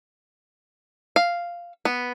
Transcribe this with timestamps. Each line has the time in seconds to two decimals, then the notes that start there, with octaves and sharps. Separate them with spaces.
1.16 F5
1.85 B3